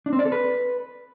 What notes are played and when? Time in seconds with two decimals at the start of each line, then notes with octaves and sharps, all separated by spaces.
0.06 D4
0.13 C4
0.19 D5
0.25 A4
0.32 B4